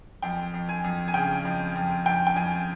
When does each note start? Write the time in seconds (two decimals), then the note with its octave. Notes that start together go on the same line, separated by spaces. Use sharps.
0.22 F2 G5
0.54 F2
0.69 G#5
0.84 F2
1.08 G#5
1.14 C#3 G5
1.45 F2
1.75 F2
2.06 F2 G5
2.27 G5
2.36 F2 G#5